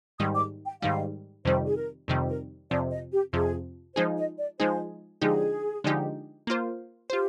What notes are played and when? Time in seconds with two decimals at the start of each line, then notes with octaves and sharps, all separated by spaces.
0.19 G#2 D#3 G3 D#6
0.36 D6
0.66 G5
0.82 G#2 D#3 G3 F5
1.45 F2 C3 D#3 G3 C5
1.67 G#4
1.76 A#4
2.08 F2 C3 D#3 G3
2.29 A#4
2.71 F2 C3 F3 D5
2.91 D#5
3.13 G4
3.33 F2 C3 F3 G#4
3.96 F3 G#3 D#4 G#4 C5
4.17 D#5
4.38 D5
4.59 F3 G#3 D#4 G#4 C5
5.22 D3 F3 G#3 D#4 G4 G#4
5.84 D3 F3 G#3 D#4 G4
6.47 A#3 F4 C5
7.10 F4 G4 C5